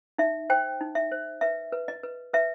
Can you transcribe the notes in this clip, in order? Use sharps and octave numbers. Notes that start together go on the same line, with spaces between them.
D#4 E5
C5 G5
D#4
E5
C5
B4 E5
B4
D#5
B4
B4 E5